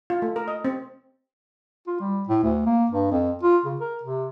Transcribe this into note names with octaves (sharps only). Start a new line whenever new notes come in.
F4
A3
A#4
D#5
C4
F4
G3
A2
D2
A#3
G2
F2
F4
C#3
A#4
C3